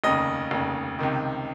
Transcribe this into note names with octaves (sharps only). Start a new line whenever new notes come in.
F1 D#2 C#3 D#5
F1 D#2 C#3
C#2 C3 D#3